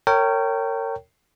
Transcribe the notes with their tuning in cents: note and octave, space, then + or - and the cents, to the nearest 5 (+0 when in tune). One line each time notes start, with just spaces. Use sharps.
A#4 -30 C#5 +0 G5 -15